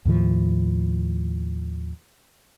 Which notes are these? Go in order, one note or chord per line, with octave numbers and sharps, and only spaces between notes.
D#2 A2 D#3 F3